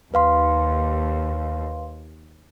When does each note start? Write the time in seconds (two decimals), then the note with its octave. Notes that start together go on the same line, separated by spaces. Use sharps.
0.14 D#2 B4 F5 C6